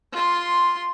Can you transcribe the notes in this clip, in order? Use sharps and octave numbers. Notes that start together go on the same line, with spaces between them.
F4 C6